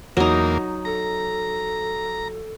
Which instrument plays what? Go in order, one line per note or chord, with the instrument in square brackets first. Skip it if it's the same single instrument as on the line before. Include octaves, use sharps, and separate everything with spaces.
[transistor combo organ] E2 A#3 [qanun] F#3 D#4
[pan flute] A4 [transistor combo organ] A#5